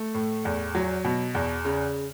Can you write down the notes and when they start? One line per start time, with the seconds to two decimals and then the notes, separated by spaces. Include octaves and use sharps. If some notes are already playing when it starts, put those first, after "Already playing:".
Already playing: A3
0.14 A2
0.45 E2
0.75 F#3
1.05 B2
1.35 E2
1.65 C#3